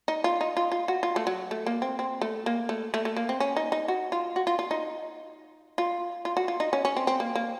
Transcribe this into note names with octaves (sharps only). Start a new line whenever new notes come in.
D#4
F4
D#4
F4
F4
F#4
F4
A3
F#3
A3
A#3
C4
C4
A3
A#3
A3
A3
A3
A#3
C4
C#4
D#4
D#4
F#4
F4
F#4
F4
F4
D#4
F4
F4
F#4
F4
D#4
C#4
C#4
C4
C4
A#3
A#3